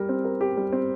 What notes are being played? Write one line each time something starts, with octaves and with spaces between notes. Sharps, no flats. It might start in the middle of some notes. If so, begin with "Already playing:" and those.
Already playing: G3 G4 A#4
C4
A#4
G4
G3
C4